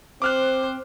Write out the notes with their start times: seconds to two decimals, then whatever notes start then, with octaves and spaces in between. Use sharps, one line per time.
0.22 C4 C5 D6 F6 F#6